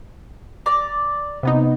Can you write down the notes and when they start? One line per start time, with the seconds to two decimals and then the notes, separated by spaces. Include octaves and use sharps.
0.66 D5 A#5
1.43 C3 B3 D#4